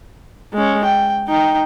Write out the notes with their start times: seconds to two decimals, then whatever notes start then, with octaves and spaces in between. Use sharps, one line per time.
0.54 G#3 C#4
0.84 G5
1.28 D#4 G5